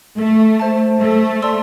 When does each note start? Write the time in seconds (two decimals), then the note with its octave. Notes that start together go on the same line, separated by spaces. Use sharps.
0.18 A3 A4
0.60 C5 E5 A5
1.01 A3 A4
1.42 D5 A5 C6 E6